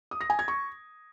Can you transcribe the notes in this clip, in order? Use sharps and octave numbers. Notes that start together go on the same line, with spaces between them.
D#6
A#6
G#5
G#6
C#6